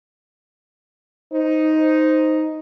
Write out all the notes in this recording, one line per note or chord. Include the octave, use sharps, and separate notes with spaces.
D#4 C5